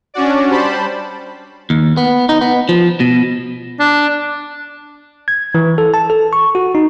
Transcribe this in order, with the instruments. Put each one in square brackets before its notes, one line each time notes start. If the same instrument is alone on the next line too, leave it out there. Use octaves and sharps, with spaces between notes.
[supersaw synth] C#4 D4 F#4 D5
G3 C5 A5 B5
[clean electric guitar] D#2
B3
D#4
B3
F3
B2
[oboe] D4
[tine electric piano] G#6
E3
A4
A5
A4
C#6
F#4
D#4